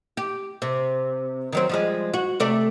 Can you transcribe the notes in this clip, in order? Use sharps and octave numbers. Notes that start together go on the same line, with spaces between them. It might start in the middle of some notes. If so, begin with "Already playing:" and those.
G4
C3
D#3 F#3 C4
F3 G3 G#3
F#4
C3 A3 D5